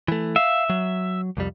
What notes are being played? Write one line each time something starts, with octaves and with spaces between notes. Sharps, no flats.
E3 A3
E5 F5
F#3
C2 F2 G3